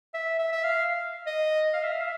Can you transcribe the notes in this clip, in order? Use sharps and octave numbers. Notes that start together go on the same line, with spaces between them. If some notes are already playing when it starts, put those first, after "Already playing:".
E5
E5
E5
F5
D#5
F5
E5
F5
E5